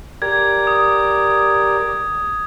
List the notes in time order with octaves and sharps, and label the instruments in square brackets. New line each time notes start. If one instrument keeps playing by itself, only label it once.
[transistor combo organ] G4 A#4 D5 [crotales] G#6
[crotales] D#6